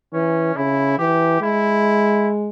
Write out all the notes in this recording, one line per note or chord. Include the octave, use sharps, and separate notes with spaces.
E3 C#4
C#3 E4
E3 G4
G#3 E4